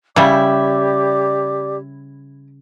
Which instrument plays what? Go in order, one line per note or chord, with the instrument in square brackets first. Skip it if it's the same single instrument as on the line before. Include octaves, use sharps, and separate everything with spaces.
[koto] C#3 G3 [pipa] E4 [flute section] G4 D5 D6